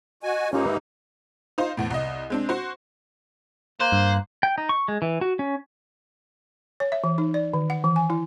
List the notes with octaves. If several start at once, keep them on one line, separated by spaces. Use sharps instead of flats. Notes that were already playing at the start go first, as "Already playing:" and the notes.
F#4 D#5 G#5
G#2 A#3 C#4 D#4 F4 G4
B4 E5
D#4 F4 C5
E2 A2
C2 D#5
G#3 C4 D4
F#4 C5
A#3 C5 F#6
G2
G5
D#4
C#6
G#3
E3
F#4
C#4
C#5
E5
E3
D#4
D5
D#3
F#5
E3
G#5
E4